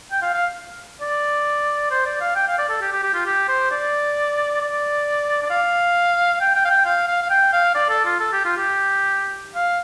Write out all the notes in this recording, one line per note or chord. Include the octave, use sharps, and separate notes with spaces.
G5
F5
F5
D5
C5
D5
F5
G5
F5
D5
A4
G4
G4
G4
F4
G4
C5
D5
D5
D5
F5
G5
G5
F5
G5
F5
F5
F5
G5
F5
D5
A4
F4
A4
G4
F4
G4
F5